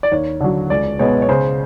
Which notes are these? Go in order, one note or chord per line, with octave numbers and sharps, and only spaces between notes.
D5
D#2 C#5
D3 F#3
C#2 D5
B2 G#3 B3 C#5
C#5
C#3 C5